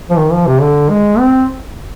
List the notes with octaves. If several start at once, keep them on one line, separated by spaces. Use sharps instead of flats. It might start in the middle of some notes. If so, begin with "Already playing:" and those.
F3
D#3
F3
C3
D3
G#3
C4